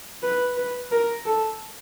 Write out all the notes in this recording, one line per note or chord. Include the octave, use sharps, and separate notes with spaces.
B4
B4
A#4
A4